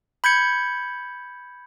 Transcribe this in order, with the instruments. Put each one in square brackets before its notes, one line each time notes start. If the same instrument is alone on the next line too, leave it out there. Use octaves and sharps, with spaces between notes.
[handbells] B5 G6 G#6 C#7